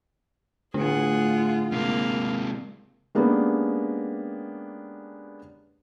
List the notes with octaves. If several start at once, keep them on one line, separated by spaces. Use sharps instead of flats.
A2 D3 A3 D4 F4 G#4 F#5
C3 G#3 A#3 F5
G#3 A#3 B3 C#4 D4 G4